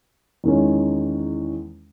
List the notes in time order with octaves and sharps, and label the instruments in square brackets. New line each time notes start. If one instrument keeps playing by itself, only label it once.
[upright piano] E2 D#3 G#3 C#4